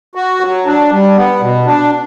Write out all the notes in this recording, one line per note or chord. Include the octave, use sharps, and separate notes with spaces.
F#4
F#3
D4
G3
B3
B2
D4